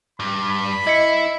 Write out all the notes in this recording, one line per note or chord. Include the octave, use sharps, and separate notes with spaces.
G2 B5
B5
E4 D#5 B6 C#7